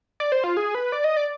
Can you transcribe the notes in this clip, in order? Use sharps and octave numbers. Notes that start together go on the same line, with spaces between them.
D5
C5
F4
G#4
B4
D5
D#5
D5